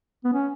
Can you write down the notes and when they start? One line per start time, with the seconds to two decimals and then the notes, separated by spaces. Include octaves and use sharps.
0.24 B3
0.33 C#4